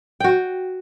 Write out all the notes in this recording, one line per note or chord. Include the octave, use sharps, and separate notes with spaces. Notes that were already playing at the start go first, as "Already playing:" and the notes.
F#4 G5